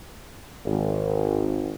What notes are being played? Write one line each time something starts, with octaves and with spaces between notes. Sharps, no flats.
G#1